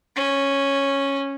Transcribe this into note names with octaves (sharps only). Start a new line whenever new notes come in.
C#4